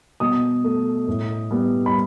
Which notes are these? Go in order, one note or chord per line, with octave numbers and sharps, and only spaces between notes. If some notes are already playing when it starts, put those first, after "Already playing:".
B2 D#6
A3
A2
G3 B3
B5